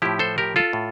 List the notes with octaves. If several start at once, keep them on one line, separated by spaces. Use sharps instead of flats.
A2 F3 E4 G4
A4 C5
G4 A#4
F4 A4
A2